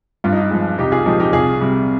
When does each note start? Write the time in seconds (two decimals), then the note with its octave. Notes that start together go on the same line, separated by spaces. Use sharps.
0.24 G2 F4
0.32 D#4
0.41 F4
0.51 F3 G#3
0.78 C2 D#4 G4
0.92 F4 G#4
1.06 A#2 F3 G#3 D#4 G4
1.20 D#4 G4
1.32 C2 F4 G#4
1.61 C3 G3